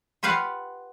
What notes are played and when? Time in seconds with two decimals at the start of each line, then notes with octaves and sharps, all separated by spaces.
0.23 F4 G4 B4 F5 F#5